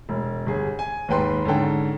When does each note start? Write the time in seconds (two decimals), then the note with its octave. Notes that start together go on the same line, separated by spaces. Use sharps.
0.09 E1
0.46 G1 G#4
0.79 G#5
1.09 D#2 G#2 B4 G5 C6
1.45 G#2 D3 C#4 A4 G5